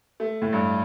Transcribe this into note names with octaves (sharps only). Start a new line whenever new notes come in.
A3
A2
G2